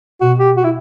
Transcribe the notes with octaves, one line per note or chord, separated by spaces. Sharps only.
B2 F#4
G4
F#4
E4